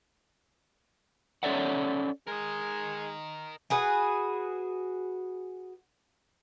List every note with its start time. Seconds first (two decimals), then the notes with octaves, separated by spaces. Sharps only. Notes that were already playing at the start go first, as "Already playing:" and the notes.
1.43 C#4 A4 C#5 D5 E5 F#5
2.28 G#3 A#4 D#5
3.70 F#4 G#4 B4